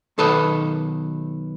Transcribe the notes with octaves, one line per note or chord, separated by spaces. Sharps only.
B1 D#3 A4 B4 D#5